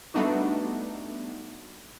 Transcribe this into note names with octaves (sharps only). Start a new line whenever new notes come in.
G3 A3 B3 D4 D#4 F#4